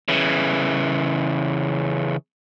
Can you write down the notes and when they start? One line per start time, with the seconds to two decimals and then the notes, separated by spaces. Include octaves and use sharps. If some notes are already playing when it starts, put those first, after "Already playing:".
0.08 C#3 E3